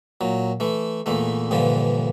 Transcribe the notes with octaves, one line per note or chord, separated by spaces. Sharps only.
A#2 F#3
E3 A3
E2 A#2 E3 A3
G2 A#2 D3 E3 F3